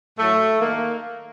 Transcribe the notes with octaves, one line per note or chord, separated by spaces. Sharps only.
A2 F#3 A3
D#3 A#3